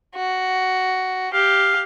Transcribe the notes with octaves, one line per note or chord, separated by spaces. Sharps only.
F#4
G4 F5